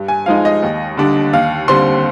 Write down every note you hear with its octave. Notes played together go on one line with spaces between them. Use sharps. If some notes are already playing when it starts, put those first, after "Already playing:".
Already playing: G2
G#5
F3 G#3 D#4 F5
D#5
D#2
D3 G3 D4
D#2 F5
D3 G3 C4 C6